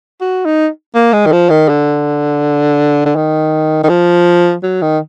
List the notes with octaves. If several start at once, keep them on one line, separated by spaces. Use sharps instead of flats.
F#4
D#4
A#3
G#3
D#3
F3
D#3
D3
D3
D#3
D#3
F3
F#3
D#3